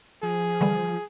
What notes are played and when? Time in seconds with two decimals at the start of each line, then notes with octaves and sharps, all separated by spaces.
0.23 F3 G#4
0.61 D3 E3 G3